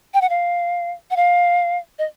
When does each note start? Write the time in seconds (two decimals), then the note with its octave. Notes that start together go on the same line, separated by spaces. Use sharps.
0.14 G5
0.21 F#5
0.30 F5
1.11 F#5
1.16 F5
1.99 D#5